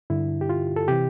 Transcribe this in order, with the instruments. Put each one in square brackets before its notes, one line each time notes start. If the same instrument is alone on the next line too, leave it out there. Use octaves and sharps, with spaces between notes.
[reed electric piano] G2 D3 E4
G4
F4
A4
C3 E3 G4